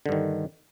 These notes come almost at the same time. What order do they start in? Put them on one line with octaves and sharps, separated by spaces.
D3 G2 D#3